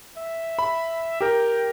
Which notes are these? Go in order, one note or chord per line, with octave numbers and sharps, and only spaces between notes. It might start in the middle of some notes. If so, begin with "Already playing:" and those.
E5
B5
G4 A#4 G5